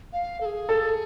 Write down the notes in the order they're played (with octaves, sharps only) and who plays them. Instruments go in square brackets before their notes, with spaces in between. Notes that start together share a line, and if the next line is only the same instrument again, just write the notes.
[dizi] F5
A4
G#4
[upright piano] A4